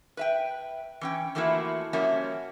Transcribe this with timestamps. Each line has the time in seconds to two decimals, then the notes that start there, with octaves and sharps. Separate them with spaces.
0.17 B4 E5 G5
1.01 E3 C#4 G5
1.35 E3 F3 A3 A#3 E4 F#4
1.93 F3 G3 A#3 C#4 F#4 E5